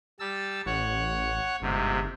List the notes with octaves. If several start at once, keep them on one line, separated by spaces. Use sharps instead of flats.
G3 A5 E6
A1 C#5 F#5
G1 G#2 C3